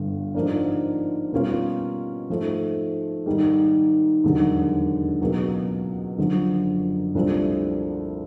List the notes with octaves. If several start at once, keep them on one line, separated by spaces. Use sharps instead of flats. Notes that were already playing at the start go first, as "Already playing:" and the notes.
Already playing: G1 G2 D3
G#2 F3 A#3 D4
B2 G3 A#3 C#4 F4
G#2 F3 A3
G#2 D#3 G3 A#3
E1 D#2 D3 F#3
C#2 B2 F#3 A#3
F#1 F#2 D3 F3
C2 A#2 F3 A3 D4